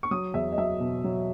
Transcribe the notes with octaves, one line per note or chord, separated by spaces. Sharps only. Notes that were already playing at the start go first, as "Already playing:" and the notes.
C#6
F#3 D#6
E2 E5
D#5
F#3 E5
B2
F#3